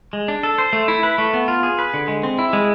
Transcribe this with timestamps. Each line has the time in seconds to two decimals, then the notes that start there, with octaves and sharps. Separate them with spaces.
0.13 G#3
0.28 D4
0.43 A4
0.58 C5
0.73 A3
0.88 E4
1.03 B4
1.18 A3
1.34 B3
1.48 F4
1.63 G#4
1.79 B4
1.94 D3
2.08 G#3
2.23 C4
2.39 E4
2.53 G#3